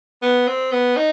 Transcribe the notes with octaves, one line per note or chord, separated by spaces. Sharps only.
B3
C4
B3
D#4